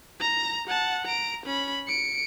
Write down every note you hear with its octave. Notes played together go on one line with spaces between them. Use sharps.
A#5 A#6
F#5 A5
A#5 D7
C#4 B5
C#7 D7